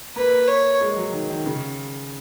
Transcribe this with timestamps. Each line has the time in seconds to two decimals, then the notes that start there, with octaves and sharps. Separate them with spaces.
0.16 A#3 B4
0.48 C#5
0.81 G#3
0.97 F#3
1.13 D#3
1.30 D#3
1.46 C#3